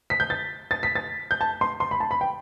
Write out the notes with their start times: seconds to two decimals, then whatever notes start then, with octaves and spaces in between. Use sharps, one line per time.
0.10 B6
0.20 G6
0.30 A6
0.71 A6
0.83 B6
0.95 A6
1.31 G6
1.41 A5
1.61 C6
1.80 C6
1.91 B5
2.00 A5
2.11 B5
2.21 G5